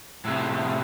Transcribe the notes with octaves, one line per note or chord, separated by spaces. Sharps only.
A2 C3